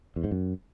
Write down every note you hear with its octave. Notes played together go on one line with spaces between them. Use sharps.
E2
G#2
F#2